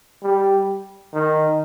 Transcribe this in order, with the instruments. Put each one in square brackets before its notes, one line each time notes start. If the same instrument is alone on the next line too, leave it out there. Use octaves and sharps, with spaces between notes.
[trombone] G3
D#3